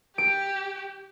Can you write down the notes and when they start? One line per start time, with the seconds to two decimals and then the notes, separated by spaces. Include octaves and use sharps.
0.18 G4 D7